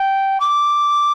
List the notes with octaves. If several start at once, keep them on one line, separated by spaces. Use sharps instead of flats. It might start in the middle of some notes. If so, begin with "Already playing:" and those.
Already playing: G5
D6